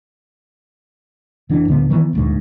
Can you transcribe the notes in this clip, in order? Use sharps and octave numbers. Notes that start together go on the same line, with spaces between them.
F1 E3 D4
D1 D3 B3
D#3 E3 B3
D#1 D2 G#2